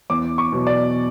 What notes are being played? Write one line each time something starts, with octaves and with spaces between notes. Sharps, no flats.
E2 D6
C#6
B2 F#3
D5